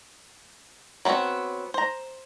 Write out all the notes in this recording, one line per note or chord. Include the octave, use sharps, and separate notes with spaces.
F#3 G3 B3 C4 F#4
C5 A#5